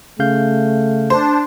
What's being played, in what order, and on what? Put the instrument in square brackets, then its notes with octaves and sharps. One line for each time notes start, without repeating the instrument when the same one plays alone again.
[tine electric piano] C#3 F5 G6 [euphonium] A3
[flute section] D4 [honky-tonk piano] C5